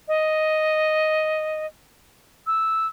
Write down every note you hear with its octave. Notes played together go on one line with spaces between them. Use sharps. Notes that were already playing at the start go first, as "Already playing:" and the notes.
D#5
E6